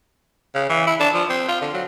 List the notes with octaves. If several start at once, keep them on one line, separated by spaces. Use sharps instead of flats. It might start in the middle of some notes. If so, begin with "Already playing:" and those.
C#3
E3
E4
D4
F3
C4
F4
D3
F#3